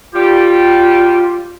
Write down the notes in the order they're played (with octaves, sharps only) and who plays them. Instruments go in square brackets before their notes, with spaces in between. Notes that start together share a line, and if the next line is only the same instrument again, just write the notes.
[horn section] G3 G4 [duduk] F4